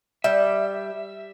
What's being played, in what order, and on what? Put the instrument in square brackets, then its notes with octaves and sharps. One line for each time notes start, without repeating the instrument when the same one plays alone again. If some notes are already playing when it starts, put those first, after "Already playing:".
[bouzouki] G3 [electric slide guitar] E5